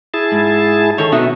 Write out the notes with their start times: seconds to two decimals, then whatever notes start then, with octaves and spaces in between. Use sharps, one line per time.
0.14 E4 G#4 A5
0.32 G#2
0.98 D#3 A4 C#5
1.12 B2 D#3 B3 D#4 F#4 E5